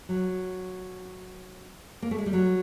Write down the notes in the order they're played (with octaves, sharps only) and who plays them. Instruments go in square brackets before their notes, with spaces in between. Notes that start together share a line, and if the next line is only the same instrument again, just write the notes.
[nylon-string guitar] F#3
A#3
A3
G#3
G3
F#3